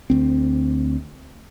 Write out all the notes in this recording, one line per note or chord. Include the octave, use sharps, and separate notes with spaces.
D2 C4